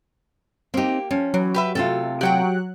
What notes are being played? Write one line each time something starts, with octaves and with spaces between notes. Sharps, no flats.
A#3 C4 D#4 G4
F3 C#4
E3 F#3
G4 B4 E5
C3 A3 F4 A4
F#3 G4 F#5 G5 F#6